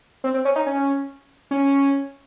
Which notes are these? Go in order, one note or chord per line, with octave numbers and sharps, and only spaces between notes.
C4
C4
C#4
D#4
C#4
C#4